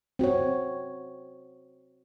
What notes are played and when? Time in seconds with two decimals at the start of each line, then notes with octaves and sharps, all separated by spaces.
0.19 C4 F#4 C#5